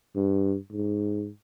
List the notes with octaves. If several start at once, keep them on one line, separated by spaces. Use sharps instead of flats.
G2
G#2